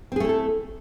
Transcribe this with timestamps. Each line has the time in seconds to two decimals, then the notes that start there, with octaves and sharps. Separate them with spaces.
0.12 C4
0.16 G#4
0.20 A3
0.25 E4
0.29 A4